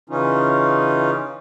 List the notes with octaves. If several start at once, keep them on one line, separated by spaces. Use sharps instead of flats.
C#3 E3 C#4 D#4 F4